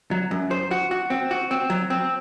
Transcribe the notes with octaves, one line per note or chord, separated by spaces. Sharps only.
F#3
F#2
C5
F#4
F#4
C4
F#4
C4
F#3
C4